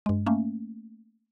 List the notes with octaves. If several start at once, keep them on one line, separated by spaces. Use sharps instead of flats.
G2 G#3
A3 A#3 C#4